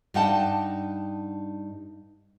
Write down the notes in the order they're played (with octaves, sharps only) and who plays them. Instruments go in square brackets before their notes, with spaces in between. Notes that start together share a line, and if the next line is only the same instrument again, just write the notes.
[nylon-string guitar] G2 D4 D#4 F#5 G5 A5